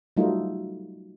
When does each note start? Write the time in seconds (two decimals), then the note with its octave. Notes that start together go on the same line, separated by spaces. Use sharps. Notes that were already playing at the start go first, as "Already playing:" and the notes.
0.17 F#3 G3 A3 D#4 F4